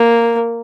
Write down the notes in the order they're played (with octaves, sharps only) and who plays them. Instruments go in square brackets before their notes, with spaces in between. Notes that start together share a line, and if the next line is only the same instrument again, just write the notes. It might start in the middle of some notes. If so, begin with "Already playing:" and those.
Already playing: [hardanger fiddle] A#3